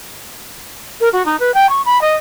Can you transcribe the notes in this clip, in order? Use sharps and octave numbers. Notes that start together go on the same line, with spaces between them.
A#4
F#4
D#4
B4
G5
C#6
B5
D#5